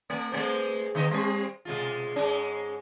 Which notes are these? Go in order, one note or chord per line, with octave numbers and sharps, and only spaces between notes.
A3
G#3 A3 C5
D3 B3 D#5
G3 C4
B2 G#3 F4
G#2 G#3 C#4